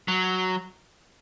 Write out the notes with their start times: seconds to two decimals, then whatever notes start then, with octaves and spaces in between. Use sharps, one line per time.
0.08 F#3